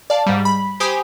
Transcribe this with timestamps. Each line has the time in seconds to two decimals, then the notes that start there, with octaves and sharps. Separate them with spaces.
0.10 D5 F5 A5
0.26 G#2 G3
0.45 B5
0.80 G4 C5 G#5 B5 D#6